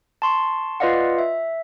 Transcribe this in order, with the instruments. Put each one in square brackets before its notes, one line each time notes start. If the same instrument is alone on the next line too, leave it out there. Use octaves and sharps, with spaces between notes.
[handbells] A5 C6 C#6
F4 B4 D5 D#5 F5 F#5
E5